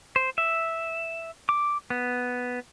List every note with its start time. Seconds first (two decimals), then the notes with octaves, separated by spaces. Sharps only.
0.16 C5
0.38 E5
1.49 D6
1.90 B3